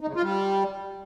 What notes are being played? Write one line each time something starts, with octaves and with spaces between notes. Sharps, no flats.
D#4
C#3
F4
G3